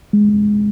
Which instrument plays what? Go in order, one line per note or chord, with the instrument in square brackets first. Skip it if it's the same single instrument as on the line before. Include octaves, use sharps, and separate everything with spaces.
[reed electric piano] G#3